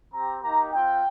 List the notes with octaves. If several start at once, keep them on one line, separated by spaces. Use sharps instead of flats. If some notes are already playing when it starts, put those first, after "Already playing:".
C4 G4 A#5
A#3 D#4 G4 A#5
C4 F4 G5